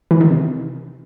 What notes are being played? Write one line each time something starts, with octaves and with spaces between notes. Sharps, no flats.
E3
D#3
C3